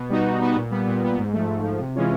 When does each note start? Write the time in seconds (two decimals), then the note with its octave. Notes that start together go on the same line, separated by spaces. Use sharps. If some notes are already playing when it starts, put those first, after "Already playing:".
Already playing: B2
0.10 G3 B3 D#4 F#4
0.25 B2
0.41 G3 B3 D#4 F#4
0.56 A#2
0.71 G3 B3
0.87 A#2
1.02 G3 B3
1.18 G#2
1.33 F3 A3
1.48 G#2
1.64 F3 A3
1.79 C3
1.95 E3 G#3 C#4 F4